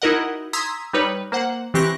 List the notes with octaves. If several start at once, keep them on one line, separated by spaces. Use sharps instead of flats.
D#4 E4 F#4 A#4 D#5 F#5
A#5 C6 D#6 E6 G#6 B6
G3 D#4 B4 C#5
A#3 C5 F#5
E3 C4 G4 C#6 F#6 A#6